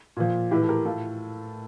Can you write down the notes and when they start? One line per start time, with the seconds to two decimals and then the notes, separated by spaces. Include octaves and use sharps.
0.17 A#2 F3
0.51 A2 E3 E4 G4
0.63 A4
0.69 G4 A#4
0.85 A2 F4 A4